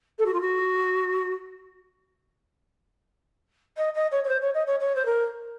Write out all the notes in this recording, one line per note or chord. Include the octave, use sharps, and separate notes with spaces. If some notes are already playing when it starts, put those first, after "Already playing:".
A4
F#4
F4
F#4
D#5
D#5
C#5
C#5
C5
C#5
D#5
C#5
C#5
C5
A#4